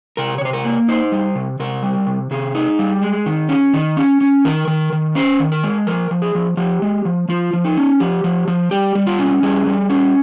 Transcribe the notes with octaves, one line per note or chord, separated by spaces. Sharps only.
C3 A#4
C#5
C3 C5
A#4
A#3
D#4 C5
G3
C3
C3 A#4
G3
C3
C3 G#4
D#4
G3
G#3
D#3
C#4
D#3
C#4
C#4
D#3 A#4
D#3
D#3
C#4 C5
D#3
A#4
G#3
F3 A#4
F3
G#4
F3
F3 G4
G#3
F3
F3 F4
F3
D#4
C#4
F3 G4
F3
F3
G3 G4
G3
F4
C#4
G3 G#4
G3
C#4